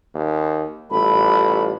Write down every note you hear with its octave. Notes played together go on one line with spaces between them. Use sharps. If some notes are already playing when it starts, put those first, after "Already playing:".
D#2
A1 G3 F4 A4 B5